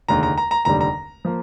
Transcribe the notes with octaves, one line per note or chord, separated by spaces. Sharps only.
F1 D#2 D3 G#3 A#5
A#5
A#5
A#5
F1 D#2 D3 G3 A#5
A#5
F3 A#3